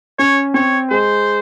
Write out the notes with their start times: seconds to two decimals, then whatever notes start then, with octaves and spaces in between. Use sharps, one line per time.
0.19 C#4 C#5
0.54 C4 C#5
0.90 G#3 C5